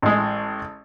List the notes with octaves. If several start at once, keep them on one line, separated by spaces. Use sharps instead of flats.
A1 G#3